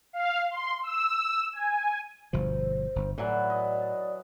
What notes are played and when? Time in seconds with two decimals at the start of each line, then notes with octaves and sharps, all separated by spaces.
0.13 F5
0.51 C6
0.83 E6
1.53 G#5
2.33 G1 B2 F3 C5
2.96 G1
3.18 A2 E3 F#3 D5
3.50 D#5